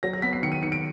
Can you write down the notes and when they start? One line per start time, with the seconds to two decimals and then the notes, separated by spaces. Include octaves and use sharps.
0.03 F#3 A#6
0.13 A#6
0.22 B3 B6
0.33 C7
0.42 D#3 C#7
0.52 D#7
0.62 D#3 C#7
0.72 D7